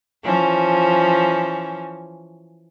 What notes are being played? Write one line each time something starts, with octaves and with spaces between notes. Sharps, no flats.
E3 F3 C#4